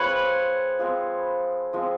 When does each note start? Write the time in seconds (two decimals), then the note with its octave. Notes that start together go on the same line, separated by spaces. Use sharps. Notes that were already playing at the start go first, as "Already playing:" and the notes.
Already playing: F3 G#3 C4 B4 C#5
0.79 F3 G#3 C4
1.73 F3 G#3 C4